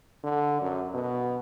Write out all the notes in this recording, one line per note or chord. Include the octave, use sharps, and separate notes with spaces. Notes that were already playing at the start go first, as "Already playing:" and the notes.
D3
F#2
B2